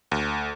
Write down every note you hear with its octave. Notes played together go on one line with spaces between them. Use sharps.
D2